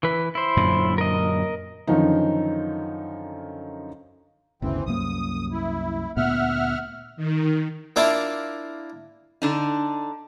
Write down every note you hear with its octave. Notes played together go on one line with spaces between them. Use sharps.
E3 B4
E4 C5
F#2 A#2 D3
A#4 D#5
F#2 D3 D#3 F3 D#4
G1 D2 C#3 E3 C4
C2 F#2 A#3 D#6
E4
D2 A#2 B3 E5 F#5 F6
D#3
A#3 D4 E4 F4
D3 D4 D#4